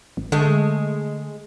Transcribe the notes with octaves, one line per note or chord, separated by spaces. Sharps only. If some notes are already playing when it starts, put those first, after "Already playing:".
G#1
D3 G#3 A3